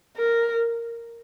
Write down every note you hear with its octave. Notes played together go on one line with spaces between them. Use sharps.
A#4